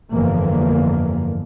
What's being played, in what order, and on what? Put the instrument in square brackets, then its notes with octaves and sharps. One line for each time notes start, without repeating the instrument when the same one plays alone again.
[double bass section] G1 F2 D3 E3 A#3